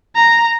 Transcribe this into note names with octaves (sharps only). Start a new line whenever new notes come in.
A#5